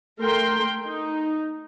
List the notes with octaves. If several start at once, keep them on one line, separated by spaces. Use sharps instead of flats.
A3 A#4 G5 C6
D#4